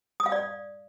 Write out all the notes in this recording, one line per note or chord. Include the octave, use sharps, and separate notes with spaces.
D#6
F5
D5